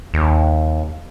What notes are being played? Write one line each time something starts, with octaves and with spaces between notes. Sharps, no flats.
D#2